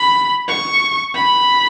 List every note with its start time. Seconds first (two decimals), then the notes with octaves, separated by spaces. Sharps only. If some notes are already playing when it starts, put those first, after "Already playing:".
Already playing: B5
0.48 C#6
1.15 B5